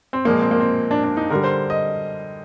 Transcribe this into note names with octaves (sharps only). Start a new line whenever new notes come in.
C4
A#2 F3 G#3 A#3
C4
A#3
C4
D4
D4
D#4
D3 G3 A#4
C5
D#5